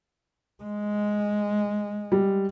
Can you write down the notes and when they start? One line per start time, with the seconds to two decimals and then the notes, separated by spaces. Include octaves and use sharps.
0.63 G#3
2.12 G3